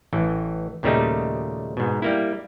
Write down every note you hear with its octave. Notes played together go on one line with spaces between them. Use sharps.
A1 E3
D#2 A#2 C#3 G3 A3 D#4
G#2 B2
G3 A#3 E4